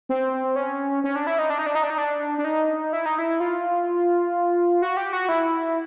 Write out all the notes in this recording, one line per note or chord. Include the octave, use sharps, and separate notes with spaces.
C4
C#4
C#4
D4
E4
D#4
D4
D#4
D4
D#4
D4
D#4
D4
D4
D#4
E4
D#4
E4
F4
F#4
G4
F#4
E4